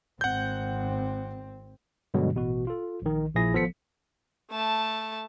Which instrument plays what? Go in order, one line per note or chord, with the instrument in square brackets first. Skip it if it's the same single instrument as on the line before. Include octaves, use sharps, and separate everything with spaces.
[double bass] G#1 C4 [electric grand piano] F#5 G6
[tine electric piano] G2 B2 D3 F#3 G#3
A1 B2 F#4
F4 A4
A#1 D#3
A#1 A#2 F3 E4 G#4 A#6
G#1 F3 B3 A4 B6 C#7
[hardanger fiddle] A3 A5